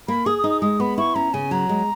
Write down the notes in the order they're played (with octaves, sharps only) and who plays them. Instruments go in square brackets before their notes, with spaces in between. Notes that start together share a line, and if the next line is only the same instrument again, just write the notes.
[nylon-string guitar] A#3 [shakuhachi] B5
[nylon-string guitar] G#4 [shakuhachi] D#6
[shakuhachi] D#6
[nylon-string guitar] D#4
[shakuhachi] D#6
[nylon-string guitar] G#3 [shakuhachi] D#6
[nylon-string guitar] B3 [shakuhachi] B5
[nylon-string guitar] E4 [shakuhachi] C#6
[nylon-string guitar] C#4 [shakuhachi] A#5
[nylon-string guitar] C#3 [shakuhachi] G#5
[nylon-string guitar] F#3 [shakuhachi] A#5
[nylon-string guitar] G#3